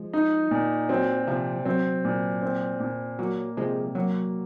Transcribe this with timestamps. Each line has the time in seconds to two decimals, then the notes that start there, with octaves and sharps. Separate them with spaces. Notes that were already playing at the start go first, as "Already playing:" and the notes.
Already playing: F3 G#3
0.13 D#4
0.51 A#2
0.89 F#3 C4
1.27 C3 F3
1.65 F#3 C4
2.05 A#2
2.42 C4
2.80 A#2
3.19 F#3 A#3
3.57 C3 F3 G#3
3.95 F#3 A#3